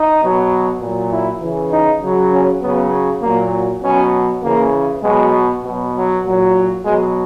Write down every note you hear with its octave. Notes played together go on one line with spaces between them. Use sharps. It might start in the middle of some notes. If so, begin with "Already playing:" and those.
Already playing: D#4
B2 F#3
A#2 F#3
E4
C#3 E3
D#4
C#3 F#3
C#4
C#3 F#3 B3
A#2 F#3 A#3
B2 F#3 C#4
C#3 E3 A#3
B2 F#3 G#3
B2 F#3
F#3
A#2 F#3
B2 F#3 G#3